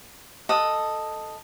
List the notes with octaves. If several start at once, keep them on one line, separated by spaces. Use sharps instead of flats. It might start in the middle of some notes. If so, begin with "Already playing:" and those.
A4 D#5 F#5